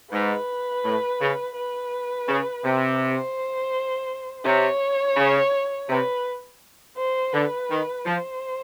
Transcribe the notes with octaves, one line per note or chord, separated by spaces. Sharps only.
G#2 B4
A2
C#3
B4
C#3
C3
C5
C3 C#5
C#3
C3 B4
C5
D3 B4
D#3
F3 C5